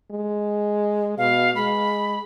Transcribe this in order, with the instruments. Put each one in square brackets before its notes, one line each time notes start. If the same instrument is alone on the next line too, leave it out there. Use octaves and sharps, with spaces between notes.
[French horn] G#3
[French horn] B2 [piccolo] F5
[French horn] G#3 [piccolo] B5